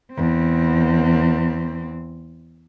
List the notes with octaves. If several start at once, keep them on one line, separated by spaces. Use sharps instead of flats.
E2 C4